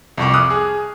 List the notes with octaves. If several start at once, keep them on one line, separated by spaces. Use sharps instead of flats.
C2 F2 C#6 D6
D6 D#6 F6 F#6
G#4